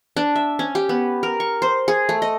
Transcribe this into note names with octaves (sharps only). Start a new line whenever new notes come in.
D4
E5
C#4
G4
B3
A#4
C#6
C5
G#4
A3
D#5